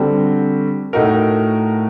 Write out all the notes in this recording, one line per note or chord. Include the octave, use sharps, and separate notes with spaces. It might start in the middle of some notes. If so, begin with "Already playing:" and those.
Already playing: D3 G3 C4 F#4
A2 A3 D#4 F#4 A#4